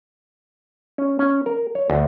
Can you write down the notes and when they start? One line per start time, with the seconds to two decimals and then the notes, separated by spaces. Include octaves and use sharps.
0.98 C#4
1.19 C#4
1.46 A#4
1.75 C#5
1.90 D2